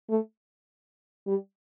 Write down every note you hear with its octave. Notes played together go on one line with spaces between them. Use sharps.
A3
G3